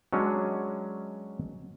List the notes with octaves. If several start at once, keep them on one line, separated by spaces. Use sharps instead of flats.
F#3 G#3 C#4 D4